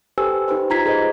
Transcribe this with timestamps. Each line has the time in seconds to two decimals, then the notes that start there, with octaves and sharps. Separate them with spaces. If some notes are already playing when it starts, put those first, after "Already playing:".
0.18 G4 A4 B4 C5 G#5 E6
0.48 D#4 G4 B4 C5
0.70 D#4 F4 A#5 G#6 B6 C7
0.85 G#4 B4 C5 D#5